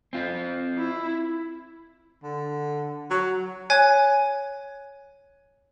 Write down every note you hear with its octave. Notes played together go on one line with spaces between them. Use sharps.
C4 F4
E4
D3
F#3
C#5 G#5 F#6